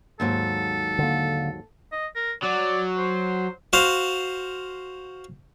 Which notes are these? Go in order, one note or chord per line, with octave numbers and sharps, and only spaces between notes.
D#2 G#2 F#3 A4
D3 A#3
D#5
A#4
F#3 D5
C5
F#4 C5 F5